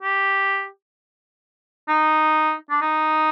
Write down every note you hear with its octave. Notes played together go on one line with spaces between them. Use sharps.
G4
D#4
D4
D#4